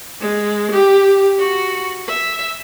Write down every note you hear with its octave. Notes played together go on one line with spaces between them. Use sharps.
G#3
G4
F#4
E5